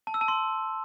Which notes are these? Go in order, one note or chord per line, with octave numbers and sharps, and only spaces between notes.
A5
E6
A5
C6